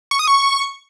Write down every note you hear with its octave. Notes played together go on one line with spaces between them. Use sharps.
C#6
D#6
C#6